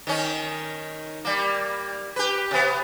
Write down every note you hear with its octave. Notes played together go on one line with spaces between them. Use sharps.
D#3 C#4 D#4
G3 A#3
G4 B4
C3 B3